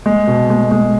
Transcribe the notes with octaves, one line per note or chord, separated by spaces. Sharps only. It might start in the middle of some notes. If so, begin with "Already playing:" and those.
G#3
B2
G#3
G#3